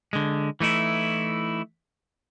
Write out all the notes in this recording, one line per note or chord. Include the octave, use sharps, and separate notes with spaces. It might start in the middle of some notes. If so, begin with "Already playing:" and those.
D3 G#3
E3 A3 D#4 E4